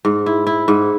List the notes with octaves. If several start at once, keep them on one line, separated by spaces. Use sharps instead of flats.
G#2
E4
E4
G#2